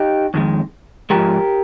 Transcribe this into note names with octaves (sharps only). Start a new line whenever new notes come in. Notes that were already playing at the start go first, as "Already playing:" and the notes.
Already playing: D#4 G4
F2 D#3 G#3
G#2 F3 G#3 G4 A#4